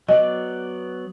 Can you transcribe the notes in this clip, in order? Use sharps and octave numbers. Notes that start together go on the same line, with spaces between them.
F#3 B3 D5 D#5